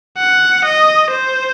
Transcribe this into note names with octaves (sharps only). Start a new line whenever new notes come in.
F#5
D#5
C5